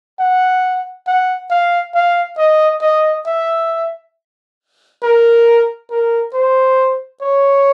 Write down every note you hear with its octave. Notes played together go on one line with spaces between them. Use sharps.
F#5
F#5
F5
F5
D#5
D#5
E5
A#4
A#4
C5
C#5